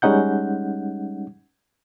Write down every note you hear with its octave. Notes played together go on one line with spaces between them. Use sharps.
G3 G#3 C#4 D#4 F#5 G6